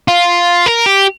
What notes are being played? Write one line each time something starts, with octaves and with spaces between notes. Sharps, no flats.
F4
A#4
G4